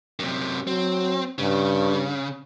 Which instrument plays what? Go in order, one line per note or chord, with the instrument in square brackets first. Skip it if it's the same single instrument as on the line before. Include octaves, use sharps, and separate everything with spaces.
[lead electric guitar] F#2 C3
[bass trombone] F#3 [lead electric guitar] C4
[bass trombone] G2 [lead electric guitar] C#3